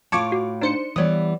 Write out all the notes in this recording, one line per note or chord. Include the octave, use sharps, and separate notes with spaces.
A2 F4 A5 C#6 D6 G#6 C#7
F#4
D4 D#4 C5 C#7
E3 G3 B3 C#5 D#6